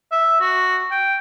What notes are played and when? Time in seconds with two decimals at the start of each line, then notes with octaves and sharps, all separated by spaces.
0.12 E5
0.41 F#4
0.91 G5